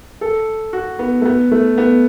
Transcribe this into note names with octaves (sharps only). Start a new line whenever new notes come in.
A4
F#4
B3
A3
B3
A3
B3